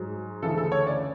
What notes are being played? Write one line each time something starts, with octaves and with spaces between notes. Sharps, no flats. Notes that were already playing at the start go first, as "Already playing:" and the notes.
Already playing: G#2 F#3
D2 C#3 E3 A4
A4
C#5
D5